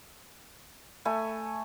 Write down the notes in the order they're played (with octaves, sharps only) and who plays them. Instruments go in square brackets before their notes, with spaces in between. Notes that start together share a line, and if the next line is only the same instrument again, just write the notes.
[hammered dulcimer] A3 G#5 B5